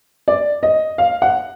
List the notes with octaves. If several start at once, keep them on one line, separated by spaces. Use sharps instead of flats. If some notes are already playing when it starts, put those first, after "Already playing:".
D5
D#5
F5
F#5